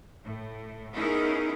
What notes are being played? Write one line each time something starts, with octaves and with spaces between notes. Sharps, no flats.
A2
B3 C#4 D#4 E4 G#4 A#4